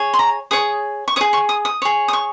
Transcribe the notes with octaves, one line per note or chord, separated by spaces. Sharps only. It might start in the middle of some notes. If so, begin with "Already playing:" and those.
Already playing: G#4 C#5
C6
A#5
G#4 C#5 D#6
C#6
C#5 D#6
G#4
C#6
D#6
D#6
G#4 C#5
D#6
C#6